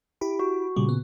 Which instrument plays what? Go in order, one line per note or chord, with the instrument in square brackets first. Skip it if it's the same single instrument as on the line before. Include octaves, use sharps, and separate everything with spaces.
[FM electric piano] E4 G4 B5
[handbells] F#4
[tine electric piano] A#2 C#3 [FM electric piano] G3
[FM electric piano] B3